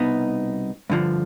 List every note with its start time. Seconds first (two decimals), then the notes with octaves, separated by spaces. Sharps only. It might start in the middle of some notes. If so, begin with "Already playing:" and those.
Already playing: C2 B2 B3 D#4
0.90 G2 D3 F3